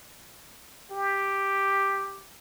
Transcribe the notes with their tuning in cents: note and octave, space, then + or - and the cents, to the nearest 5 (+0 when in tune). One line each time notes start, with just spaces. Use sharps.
G4 +5